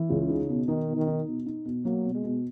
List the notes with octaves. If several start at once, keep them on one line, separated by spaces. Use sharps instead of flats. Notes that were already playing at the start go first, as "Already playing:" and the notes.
Already playing: E3
C#2 C#3
D#4
B2
D#3 D#4
B2
D#3
D#4
B2
D#4
B2
F#3 A#3
B2
G#3
B2